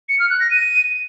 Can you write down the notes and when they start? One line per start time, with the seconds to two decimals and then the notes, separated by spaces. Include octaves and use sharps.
0.09 C#7
0.19 F6
0.30 F#6
0.40 A#6
0.51 D#7